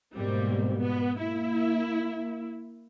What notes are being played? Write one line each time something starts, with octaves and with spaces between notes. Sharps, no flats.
G#2 B2 G3 A#3 C4
B3
A#3 E4